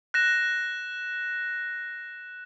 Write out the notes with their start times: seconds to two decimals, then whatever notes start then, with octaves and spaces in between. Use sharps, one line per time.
0.14 F#6 A#6 E7